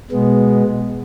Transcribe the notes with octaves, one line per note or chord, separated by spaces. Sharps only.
B2 G#3 B3